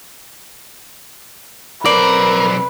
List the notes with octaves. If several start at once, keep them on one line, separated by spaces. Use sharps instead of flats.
B1 C4 A#4 B4 D5